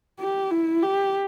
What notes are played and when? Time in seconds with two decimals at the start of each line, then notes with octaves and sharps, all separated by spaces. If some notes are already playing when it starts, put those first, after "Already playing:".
0.20 G4
0.51 E4
0.82 G4